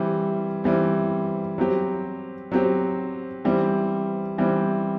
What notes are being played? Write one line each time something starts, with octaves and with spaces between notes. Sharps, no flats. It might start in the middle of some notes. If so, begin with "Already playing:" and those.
Already playing: E3 G3 C4
E3 G3 C4
F#3 C4 G4
F#3 C4 G4
E3 G3 C4
E3 G3 C4